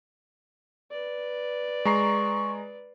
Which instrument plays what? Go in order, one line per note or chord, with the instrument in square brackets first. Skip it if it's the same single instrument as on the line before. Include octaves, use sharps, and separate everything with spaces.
[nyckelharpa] B4 D5
[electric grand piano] G#3 A#5 C7 [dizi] C#6